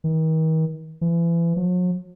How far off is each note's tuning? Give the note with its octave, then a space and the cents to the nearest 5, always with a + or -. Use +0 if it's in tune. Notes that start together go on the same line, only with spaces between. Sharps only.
D#3 +40
E3 +35
F#3 -45